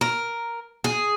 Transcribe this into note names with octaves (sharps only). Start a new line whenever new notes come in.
A#4
G#4